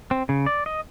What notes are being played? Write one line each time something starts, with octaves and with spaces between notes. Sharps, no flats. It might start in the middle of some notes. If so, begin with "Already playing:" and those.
C4
C#3
D5
D#5